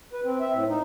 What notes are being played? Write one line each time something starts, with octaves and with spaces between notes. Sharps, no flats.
B4
C4
E5
A2
D#4